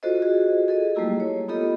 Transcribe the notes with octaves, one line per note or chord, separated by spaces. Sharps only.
F4 F#4 A4 C5 D#5
F4 F#4 G#4 D#5
G#4 A4 D#5
F#3 G3 A3 A#3 E4 G4
C#5
B3 D#4 F4 G4 A4 D#5